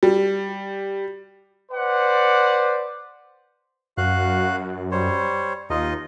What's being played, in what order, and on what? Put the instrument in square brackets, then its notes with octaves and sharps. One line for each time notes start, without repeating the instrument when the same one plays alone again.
[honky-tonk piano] G3
[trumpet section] B4 C5 D5 F#5
[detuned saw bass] F#2 [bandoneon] F#4 F5 F#6
[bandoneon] G3 C5 C#5
[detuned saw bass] D#2 [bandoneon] D#4 F4 D#5